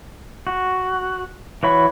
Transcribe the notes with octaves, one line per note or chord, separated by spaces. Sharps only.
F#4
E3 F#4 C#5 B5